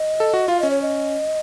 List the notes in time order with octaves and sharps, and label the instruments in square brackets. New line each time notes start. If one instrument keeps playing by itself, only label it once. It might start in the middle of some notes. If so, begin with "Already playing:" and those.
Already playing: [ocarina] D#5
[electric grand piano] A4
F#4
[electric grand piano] F4 [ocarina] F5
[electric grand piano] C#4 [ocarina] D#5
[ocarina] C#5
D#5